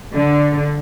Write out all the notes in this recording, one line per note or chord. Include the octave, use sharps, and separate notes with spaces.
D3